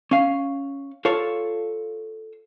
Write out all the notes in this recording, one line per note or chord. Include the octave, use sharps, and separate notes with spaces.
C#4 F5
F4 A4 C#5